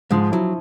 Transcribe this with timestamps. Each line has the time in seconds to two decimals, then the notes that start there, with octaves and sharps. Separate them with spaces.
0.11 G#2 F3 G#3
0.32 F#3 E4